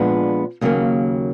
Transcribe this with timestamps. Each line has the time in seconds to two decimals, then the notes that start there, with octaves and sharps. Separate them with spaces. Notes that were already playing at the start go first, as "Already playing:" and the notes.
Already playing: A#2 F3 G#3 B3 D4
0.61 D#2 C#3 F#3 A#3